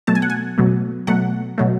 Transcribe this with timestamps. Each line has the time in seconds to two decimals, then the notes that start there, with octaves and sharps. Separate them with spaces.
0.07 B2 F#3 A3 A5
0.15 G#5
0.22 F#5
0.30 G#5
0.58 B2 F#3 A3
1.07 B2 F#3 A3 F#5
1.58 B2 F#3 A3